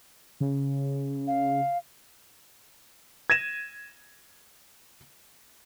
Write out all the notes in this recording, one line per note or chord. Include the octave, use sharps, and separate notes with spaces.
C#3
F5
G#6 A#6 D#7 E7